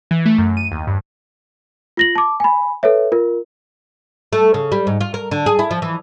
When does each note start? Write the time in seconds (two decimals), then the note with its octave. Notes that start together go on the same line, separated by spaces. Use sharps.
0.11 E3
0.26 A3
0.38 F#2
0.57 D#7
0.71 D#2
0.87 G2
1.97 F4 A#6 F#7
2.16 A5 D6
2.40 G#5 B5
2.83 A4 B4 C#5 E5
3.12 F4 A#4
4.33 A3
4.54 C#3
4.72 G3
4.87 G#2
5.01 F4
5.14 A#4
5.31 D3
5.46 G#4
5.59 E4
5.71 F3
5.82 E3